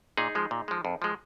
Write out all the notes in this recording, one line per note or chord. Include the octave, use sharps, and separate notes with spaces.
A#2 D#4 G#4
F3 G#3
A#2
F3 G#3
F2
F3 G#3